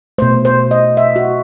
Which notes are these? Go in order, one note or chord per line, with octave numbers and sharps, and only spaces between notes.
B2 A3 C5
C5
D#5
E5
F#4